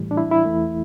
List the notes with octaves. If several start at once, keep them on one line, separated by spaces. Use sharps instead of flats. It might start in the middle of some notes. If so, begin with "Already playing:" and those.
Already playing: A2 E3 G3
D4
E4
E4
E2 E3 A3